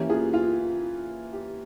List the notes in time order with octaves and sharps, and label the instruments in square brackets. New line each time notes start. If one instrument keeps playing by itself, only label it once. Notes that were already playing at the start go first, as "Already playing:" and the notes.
Already playing: [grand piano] E3 A#3 C#4 [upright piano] G4
[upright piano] F4 G#4
F4
G4